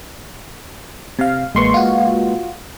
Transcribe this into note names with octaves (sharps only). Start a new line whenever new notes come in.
C3 F5
A1 G#3 A#3 B4 C6 C#6
F4 F#4